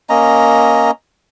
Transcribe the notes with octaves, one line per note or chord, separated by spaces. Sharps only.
A#3 C#4 D#5 A#5